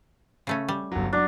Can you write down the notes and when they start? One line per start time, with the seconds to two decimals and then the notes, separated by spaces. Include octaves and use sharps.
0.47 C#3 A3 C#4
0.69 G3
0.92 G1 F#3
1.13 F#3 D4